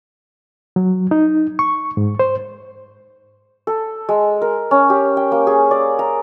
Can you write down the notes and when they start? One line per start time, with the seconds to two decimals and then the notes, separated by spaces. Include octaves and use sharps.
0.76 F#3
1.11 D#4
1.59 C#6
1.97 G#2
2.19 C5
3.67 A4
4.09 G#3
4.42 A#4
4.71 C#4
4.90 G4
5.17 G5
5.32 A#3
5.47 G#4
5.71 D5
5.99 A#5